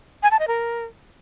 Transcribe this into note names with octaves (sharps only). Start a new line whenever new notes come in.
G#5
A5
D#5
A#4